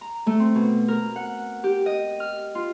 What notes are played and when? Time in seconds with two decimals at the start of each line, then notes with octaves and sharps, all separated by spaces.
0.01 A#5
0.26 A3
0.40 C4
0.55 B2
0.88 A#4
1.16 F#5
1.64 G4
1.86 D#5
2.20 F6
2.55 F4